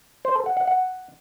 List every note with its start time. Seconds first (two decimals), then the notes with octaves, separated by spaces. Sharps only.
0.25 C5
0.35 A4
0.46 F#5
0.57 F#5
0.67 F#5